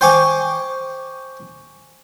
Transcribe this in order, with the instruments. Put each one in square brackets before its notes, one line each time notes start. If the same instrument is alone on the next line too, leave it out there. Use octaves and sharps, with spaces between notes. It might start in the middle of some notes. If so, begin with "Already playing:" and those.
[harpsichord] C5 G5 G#5 C#6 D6